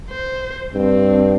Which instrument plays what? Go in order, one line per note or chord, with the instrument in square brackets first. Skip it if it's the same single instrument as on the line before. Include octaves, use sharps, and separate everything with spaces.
[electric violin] C5
[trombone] G2 [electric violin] C4